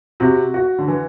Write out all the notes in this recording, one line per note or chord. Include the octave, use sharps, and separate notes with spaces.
C3 F#4
F#4
D3
E3